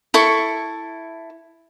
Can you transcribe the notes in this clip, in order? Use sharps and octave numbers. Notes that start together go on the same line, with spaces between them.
E4 A4 C#6